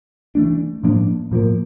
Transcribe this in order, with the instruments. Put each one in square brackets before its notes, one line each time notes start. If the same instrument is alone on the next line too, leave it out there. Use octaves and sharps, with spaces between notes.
[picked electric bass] E3 A3 D4
A2 F3 A#3 D4
A2 F3 A#3